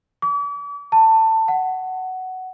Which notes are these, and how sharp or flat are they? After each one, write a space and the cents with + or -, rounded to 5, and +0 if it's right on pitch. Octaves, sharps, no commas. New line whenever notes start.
D6 -40
A5 +20
F#5 +10